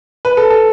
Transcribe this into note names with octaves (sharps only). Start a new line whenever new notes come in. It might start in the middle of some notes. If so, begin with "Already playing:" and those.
B4
A4
A4